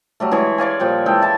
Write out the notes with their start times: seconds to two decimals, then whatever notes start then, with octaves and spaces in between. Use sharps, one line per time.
0.20 F#3 G3 A3
0.31 E3 G#3 G#4 C#5
0.58 C#5 D5 F5 G#5
0.80 A#2 F3 G3 G5
1.06 E3 G#3 A4 G5
1.22 E4 A5